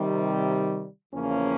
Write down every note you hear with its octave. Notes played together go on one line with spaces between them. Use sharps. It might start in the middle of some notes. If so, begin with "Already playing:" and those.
Already playing: C3 D#3 G3
E2 C#3 F3 A#3 C#4